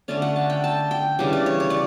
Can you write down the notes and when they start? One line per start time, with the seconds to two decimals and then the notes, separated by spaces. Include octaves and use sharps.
0.08 D3 A3 C#4 D5
0.22 F#5
0.36 A5
0.50 G5
0.64 A5
0.91 G5
1.19 C#3 E3 G3 D4
1.33 D5
1.46 C#5
1.60 C#5
1.70 D5